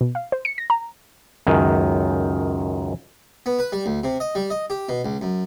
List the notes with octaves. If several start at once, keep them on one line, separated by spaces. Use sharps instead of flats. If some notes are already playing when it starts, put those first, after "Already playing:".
B2
F5
C5
C#7
A#6
A#5
C#2 F#2 D#3
B3
B4
G3
D2
C3
D#5
G3
D#5
G4
B2
C#2
F#2